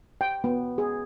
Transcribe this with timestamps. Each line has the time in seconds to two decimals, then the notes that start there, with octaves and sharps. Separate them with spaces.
0.21 G5
0.44 B3
0.78 G#4